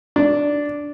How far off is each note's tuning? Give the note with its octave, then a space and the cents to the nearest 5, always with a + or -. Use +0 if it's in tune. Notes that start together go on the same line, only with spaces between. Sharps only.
D4 -5